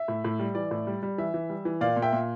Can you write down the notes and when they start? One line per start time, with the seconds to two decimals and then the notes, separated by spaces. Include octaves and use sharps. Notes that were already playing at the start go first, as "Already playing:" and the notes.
Already playing: E5
0.08 A2
0.25 A2
0.39 G3
0.55 E3 D5
0.71 A2
0.87 G3
1.03 G3
1.18 E3 E5
1.34 E3
1.50 G3
1.65 E3
1.81 A#2 D5 F5
1.96 A#2
2.02 E5 G5
2.13 A#2